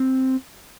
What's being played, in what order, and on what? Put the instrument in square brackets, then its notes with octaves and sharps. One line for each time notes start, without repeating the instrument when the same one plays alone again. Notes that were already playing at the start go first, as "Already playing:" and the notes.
Already playing: [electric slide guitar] C4